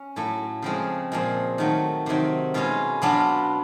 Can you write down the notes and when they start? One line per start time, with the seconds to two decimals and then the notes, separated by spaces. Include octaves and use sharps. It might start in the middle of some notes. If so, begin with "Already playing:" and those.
Already playing: C#4
0.16 A2 F#3 A3
0.62 C#3 F3 G#3 C4
1.12 A#2 F3 G#3
1.58 D#3 F#3 A3
2.06 C3 D#3 F#3
2.54 B2 G#3 C#4 F4
3.02 B2 F#3 B3 D4 F4